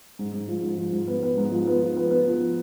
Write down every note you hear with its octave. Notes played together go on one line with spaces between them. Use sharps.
G#2
G#2
F3
G#2
F3
G#2
B3
B3
G#2
F3
B3
F3
B3
B3
F3